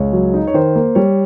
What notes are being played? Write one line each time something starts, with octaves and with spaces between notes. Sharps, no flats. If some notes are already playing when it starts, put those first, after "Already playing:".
Already playing: C#2 C#5
F#3
D#4
C#5
D#3 C5
A#3
G3 C#5